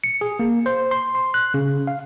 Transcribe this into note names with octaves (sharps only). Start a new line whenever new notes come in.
C#7
G#4
A#3
C5
C6
C6
F#6
C#3
F5